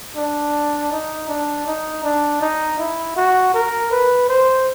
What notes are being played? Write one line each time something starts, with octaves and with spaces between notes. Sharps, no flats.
D4
D#4
D4
D#4
D4
D#4
E4
F#4
A#4
B4
C5